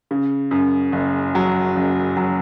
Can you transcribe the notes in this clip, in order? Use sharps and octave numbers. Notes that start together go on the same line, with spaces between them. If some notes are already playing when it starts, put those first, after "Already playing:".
C#3
F#2
F#1
F#3
F#1
F#3